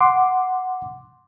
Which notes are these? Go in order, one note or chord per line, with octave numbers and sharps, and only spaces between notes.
F#5 C6 D6